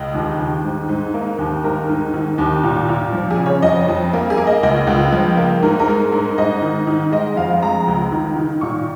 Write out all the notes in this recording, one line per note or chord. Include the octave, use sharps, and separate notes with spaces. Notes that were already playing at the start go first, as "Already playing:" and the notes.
Already playing: C#2 D#5
D#2
D#2
G#2
G#2
A#3
D#2
G#2 A#4
G#2
D#3
D#2
A#2
A#2
F3
G#4
C#3
C#5
F2 D#5
F2
A#3
G#4
A#3
D#5
C#2 D#5
C#2
F3
A#3
G#2 A#4
A#4
G#3
G#2 A#4
G#2 D#5
D#3
D#3
G#3 D#5
F2 F5
G#3 A#5
C#2
D#3
D#3
A#2 C#6